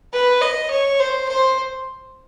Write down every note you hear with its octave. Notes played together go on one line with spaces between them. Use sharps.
B4
D#5
C#5
C5
C5